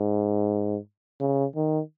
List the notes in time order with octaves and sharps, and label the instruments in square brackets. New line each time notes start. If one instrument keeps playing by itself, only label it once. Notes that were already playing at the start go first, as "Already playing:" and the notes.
Already playing: [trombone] G#2
C#3
D#3